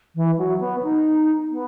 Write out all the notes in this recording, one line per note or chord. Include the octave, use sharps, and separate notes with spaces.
E3
F#3
B3
D#4
B3